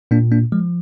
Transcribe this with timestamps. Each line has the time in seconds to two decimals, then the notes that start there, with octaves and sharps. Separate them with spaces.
0.11 A#2 A#3 D4
0.32 A#3 D4
0.52 F3 G#3